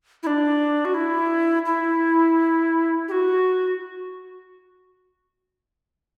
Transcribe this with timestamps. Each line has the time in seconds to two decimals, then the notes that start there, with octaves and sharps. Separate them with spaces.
0.23 E4
0.27 D4
0.85 F#4
0.94 E4
1.66 E4
3.08 G4
3.12 F#4